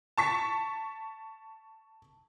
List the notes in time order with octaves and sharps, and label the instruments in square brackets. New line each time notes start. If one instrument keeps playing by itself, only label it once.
[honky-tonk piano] A5 C#6 B6